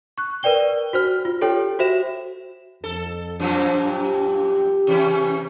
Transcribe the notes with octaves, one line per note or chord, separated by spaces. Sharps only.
C#6 F#6
A#4 B4 D5 G5 G7
F#4 C5 F6
F4
G4 A4 C#5 G5
F#4 C5 E5 E7
F2 A4
F#2 A#2 F3
G4
C3 E3 C#4